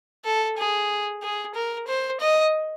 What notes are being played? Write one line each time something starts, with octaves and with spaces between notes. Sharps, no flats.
A4
G#4
G#4
A#4
C5
D#5